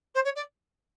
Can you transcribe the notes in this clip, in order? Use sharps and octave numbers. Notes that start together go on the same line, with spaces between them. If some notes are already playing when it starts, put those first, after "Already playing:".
C5
C#5
D5